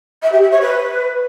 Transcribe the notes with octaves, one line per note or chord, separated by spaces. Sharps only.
E5
G4
E5
C#5
B4